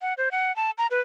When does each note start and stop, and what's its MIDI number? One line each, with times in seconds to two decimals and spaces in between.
0.02 0.14 78
0.18 0.29 72
0.32 0.54 78
0.56 0.71 81
0.78 0.87 82
0.91 1.00 71